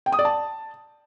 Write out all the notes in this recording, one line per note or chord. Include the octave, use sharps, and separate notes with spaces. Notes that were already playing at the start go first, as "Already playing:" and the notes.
G5
D#6
D5
A5